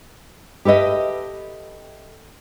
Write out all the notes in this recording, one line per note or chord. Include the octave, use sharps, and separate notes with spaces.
G4 A4 B4 D#5 E5